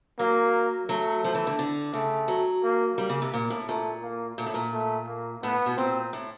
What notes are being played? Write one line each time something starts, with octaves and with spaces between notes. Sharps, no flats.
F#3 A#3
F#3 A3
F3
E3
D3
D3
C#3 A3
F#3
A#3
G3 A#3
C#3
C3
A#2 A#3
A2
A#2 A3
A#3
A#2 A3
A2
A#2
A3
A#3
A2 B3
B2
A#2 C4
A2